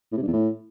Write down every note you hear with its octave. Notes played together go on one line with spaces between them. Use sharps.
A2
C3
G2
E2
A2